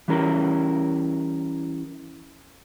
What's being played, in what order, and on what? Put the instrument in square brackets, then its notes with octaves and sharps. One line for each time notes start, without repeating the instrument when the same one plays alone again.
[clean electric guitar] E3 G3 C#4 E4 A#4